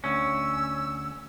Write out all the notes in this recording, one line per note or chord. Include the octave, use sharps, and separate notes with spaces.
D2 C#4 E6